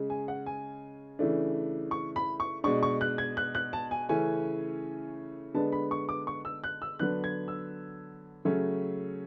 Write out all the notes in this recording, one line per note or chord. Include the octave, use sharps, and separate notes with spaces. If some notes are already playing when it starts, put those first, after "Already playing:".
Already playing: C#3 G#3 C#4
G#5
F#5
G#5
C#3 E3 A3 D4
C#6
B5
C#6
B2 G#3 D4 C#6
C#6
F#6
G#6
F#6
F#6
A5
G#5
C#3 E3 A3 C#4 G#5
D3 G#3 B3 D4 A5
B5
C#6
D6
C#6
E6
F#6
E6
D3 F#3 B3 D4 F#6
G#6
E6
C#3 F#3 A3 C#4